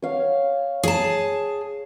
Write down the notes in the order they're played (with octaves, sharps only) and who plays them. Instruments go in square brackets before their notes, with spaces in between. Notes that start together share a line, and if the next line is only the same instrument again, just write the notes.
[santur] C#5 F5
[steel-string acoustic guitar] G#4 A5